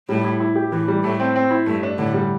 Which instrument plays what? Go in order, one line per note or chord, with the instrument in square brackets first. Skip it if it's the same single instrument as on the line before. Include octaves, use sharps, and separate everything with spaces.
[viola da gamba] A2 [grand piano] G3
[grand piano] E4
E4
G4
[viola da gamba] A2 [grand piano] E3
[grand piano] G3
[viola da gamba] A2 [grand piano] A3
[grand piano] C4
C4
E4
[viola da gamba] G2 [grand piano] A3
[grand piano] D4
[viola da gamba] A2 [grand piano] D3
[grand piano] G3